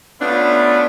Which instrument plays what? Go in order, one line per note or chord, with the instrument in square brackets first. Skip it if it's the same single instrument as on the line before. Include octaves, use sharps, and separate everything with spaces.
[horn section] A3 B3 C#4 D4 E4 F4